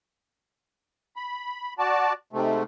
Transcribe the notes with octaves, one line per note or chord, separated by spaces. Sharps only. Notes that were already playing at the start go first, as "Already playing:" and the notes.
B5
F#4 D5 A5
G#2 C3 A3